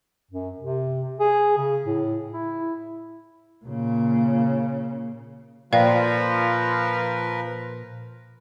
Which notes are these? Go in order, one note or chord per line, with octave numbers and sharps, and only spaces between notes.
F#2
C3
G#4
C#3
A2
E4
A#2 C#3
A#2 F3 A#4 B4 D5 F5 G5